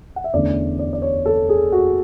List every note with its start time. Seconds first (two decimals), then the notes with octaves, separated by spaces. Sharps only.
0.16 F#5
0.24 E5
0.33 E2 D3 A3 C#4 D5
0.79 D5
0.93 D5
1.02 C#5
1.26 A4
1.49 G#4
1.72 F#4